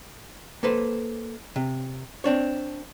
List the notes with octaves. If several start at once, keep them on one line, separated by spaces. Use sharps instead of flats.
A#3 A4 B4 C5
C3
C4 D4 C#5